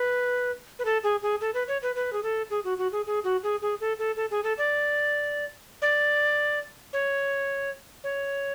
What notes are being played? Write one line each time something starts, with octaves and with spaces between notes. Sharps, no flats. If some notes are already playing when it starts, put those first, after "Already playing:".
Already playing: B4
B4
A4
G#4
G#4
A4
B4
C#5
B4
B4
G#4
A4
G#4
F#4
F#4
G#4
G#4
F#4
G#4
G#4
A4
A4
A4
G#4
A4
D5
D5
C#5
C#5